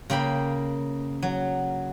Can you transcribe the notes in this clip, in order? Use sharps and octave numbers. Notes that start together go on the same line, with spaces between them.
C#3 A#3 G5 B5
F#3